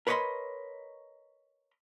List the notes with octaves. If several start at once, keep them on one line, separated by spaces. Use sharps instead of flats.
A#4 B4 C#5 D#5 B5 C6